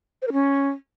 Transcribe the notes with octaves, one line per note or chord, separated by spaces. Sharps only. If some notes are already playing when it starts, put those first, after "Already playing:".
C5
A#4
C#4